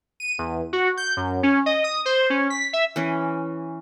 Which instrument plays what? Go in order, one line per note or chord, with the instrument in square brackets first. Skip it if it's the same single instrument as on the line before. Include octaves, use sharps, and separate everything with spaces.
[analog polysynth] D#7
E2
F#4
G6
F#2
C#4
D#5
D#6
C5
C#4
B6
E5
[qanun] E3 C#4